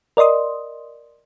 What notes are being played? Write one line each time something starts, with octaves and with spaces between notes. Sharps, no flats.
A#4 D5 D#5 C6 D#6